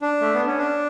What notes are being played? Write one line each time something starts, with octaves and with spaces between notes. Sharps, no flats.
D4
A3
B3
C#4
D4